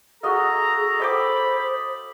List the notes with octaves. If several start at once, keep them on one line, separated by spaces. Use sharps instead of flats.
F#4 G#4 A4 D#5 F5 A#5
C5 D#5 G5 B5 D6